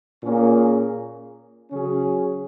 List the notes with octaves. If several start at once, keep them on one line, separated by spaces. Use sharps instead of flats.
A#2 A#3 C#4 G#4
C#3 F#3 C#4 G#4